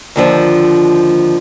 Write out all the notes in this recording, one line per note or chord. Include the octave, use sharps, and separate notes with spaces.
D#2 D3 F3